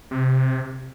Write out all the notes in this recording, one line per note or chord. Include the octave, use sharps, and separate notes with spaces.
C3